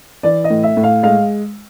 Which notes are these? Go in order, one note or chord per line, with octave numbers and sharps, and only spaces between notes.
E3 D5
D#5
A2
E5
A2
F5
G#3 F5